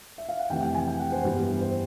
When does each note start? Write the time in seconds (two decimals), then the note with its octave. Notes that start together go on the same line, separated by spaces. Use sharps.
0.18 E5
0.29 F5
0.39 F#5
0.50 F2 C3 E3 A3 G5
0.62 G5
0.75 G#5
0.88 G5
0.99 F#5
1.12 C5
1.24 G2 E3 G3 B3
1.61 C5